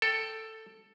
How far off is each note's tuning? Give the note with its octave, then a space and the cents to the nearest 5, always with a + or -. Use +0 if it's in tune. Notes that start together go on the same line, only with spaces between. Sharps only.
A4 +5 G5 +0